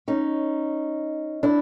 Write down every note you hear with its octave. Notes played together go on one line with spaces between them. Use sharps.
C#4 D#4
D4 E4